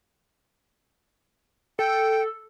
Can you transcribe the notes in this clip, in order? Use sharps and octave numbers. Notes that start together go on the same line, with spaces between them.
A4 G5